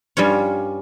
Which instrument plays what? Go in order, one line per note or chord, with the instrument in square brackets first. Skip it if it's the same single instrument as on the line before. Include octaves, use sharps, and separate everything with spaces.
[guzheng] G2 G3 C#4 F4 C#5